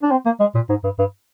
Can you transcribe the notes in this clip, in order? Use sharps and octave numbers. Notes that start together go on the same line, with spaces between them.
D4
C4
A#3
G#3
A#2
G#2
G2
G2